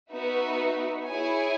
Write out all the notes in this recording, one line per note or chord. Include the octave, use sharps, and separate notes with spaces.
B3 D#4 F#4 B4 E5
E4 G#4 C#5 G#5